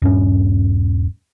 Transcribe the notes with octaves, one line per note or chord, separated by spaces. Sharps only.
D#1 G2 C#4